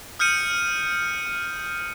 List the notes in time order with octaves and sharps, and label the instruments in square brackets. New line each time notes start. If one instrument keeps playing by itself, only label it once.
[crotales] D#6 F6 G6 C#7 D#7